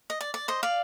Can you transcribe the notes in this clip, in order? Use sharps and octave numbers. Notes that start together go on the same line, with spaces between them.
D#5
D5
D5
C5 D#5
D5 F5